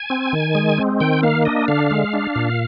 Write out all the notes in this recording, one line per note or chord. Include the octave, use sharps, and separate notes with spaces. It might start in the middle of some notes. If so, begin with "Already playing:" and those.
Already playing: G#5
C4
D#3
G#3
C4
D#3 G5
A#3 F5
D4 D#5
D3 F5
G#3
D4
A#2